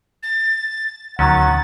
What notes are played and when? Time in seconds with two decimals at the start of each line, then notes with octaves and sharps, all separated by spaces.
0.23 A6
1.19 D2 D#3 F#3 C#4 F#5 A6